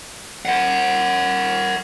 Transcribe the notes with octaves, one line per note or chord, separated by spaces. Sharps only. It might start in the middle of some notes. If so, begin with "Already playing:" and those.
A#4 F#5